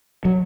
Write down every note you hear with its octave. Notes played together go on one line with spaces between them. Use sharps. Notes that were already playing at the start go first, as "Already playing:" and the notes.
F#3